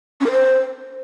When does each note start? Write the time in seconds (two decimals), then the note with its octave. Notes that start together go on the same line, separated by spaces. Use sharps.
0.20 C#4
0.26 A#4
0.31 C5